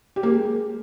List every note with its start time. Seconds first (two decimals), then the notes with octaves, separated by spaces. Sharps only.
0.16 G4
0.23 A#3
0.30 G#3